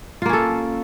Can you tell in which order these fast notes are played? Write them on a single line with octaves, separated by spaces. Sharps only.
F4 A#3 C#4 A4